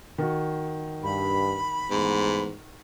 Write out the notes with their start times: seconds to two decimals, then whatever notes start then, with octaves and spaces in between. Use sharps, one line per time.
0.18 D#3 F#4
1.03 G2 B5
1.91 G#2 E3 A3 B3